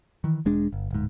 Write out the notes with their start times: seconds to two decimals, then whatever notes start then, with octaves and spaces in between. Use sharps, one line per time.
0.24 D#3 E3
0.45 E1 G#3 D4
0.73 G1
0.91 D1 G#2